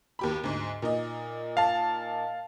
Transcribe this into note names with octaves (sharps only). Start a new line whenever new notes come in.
D#2 G4 B5
D2 G#2
A#2 D#4 D#5
F5 A5